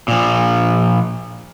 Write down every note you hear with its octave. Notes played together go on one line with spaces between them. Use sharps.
A#2 F3